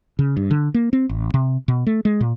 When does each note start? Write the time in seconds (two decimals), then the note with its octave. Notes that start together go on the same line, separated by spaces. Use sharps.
0.19 C#3
0.37 G2
0.51 D3
0.74 A#3
0.93 C4
1.09 A1
1.34 C3
1.68 B2
1.87 A3
2.05 G#3
2.21 A#2